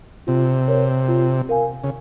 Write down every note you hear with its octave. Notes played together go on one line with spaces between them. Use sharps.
C3 F4
A#4 C#5
F4
A#4 F5 G#5
C#3